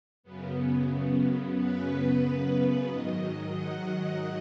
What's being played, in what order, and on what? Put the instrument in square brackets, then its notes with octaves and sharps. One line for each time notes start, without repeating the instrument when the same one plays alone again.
[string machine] F#2 C#3 B3
B4
G#2 D#3 F#3 D#5
F#5